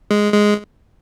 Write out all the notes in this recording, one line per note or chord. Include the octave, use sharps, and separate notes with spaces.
G#3
G#3